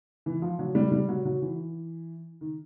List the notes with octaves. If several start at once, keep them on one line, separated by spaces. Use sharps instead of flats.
E3
F3
F#3
G3
G3
F#3
F#3
E3
D#3